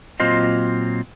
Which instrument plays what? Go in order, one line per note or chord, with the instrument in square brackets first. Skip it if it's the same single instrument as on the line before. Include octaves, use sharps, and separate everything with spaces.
[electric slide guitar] A#2 F#3 C4 F4 C5 D#5